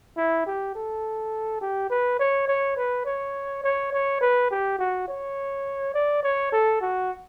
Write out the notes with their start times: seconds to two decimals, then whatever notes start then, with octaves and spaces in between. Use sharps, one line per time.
0.17 E4
0.46 G4
0.75 A4
1.61 G4
1.90 B4
2.19 C#5
2.48 C#5
2.77 B4
3.05 C#5
3.64 C#5
3.92 C#5
4.21 B4
4.50 G4
4.79 F#4
5.08 C#5
5.94 D5
6.23 C#5
6.52 A4
6.81 F#4